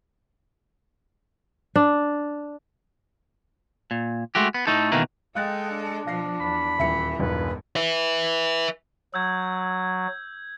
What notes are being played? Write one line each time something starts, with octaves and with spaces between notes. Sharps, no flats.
D4
A#2
G#3 A3 F#4 G4
B3
A2 A3 D#4 A4
B2 D#3 E3 A3 A#3
G#3 A4 D#5 F5 G5 F#6 A6
D4
B2 F3 F5 A#6 C7
E2 B5
D#1 E3 E5 C#7
E1 B1 G2 F4 B4
B4 E5
F#3 E6 G6 G#6